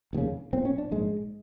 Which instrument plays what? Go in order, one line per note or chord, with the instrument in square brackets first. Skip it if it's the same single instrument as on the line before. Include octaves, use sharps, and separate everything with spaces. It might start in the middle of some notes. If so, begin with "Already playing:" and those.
[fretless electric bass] F1 D#2 C#3
B1 A#2 C4
C#4
D4
A#1 G#2 G#3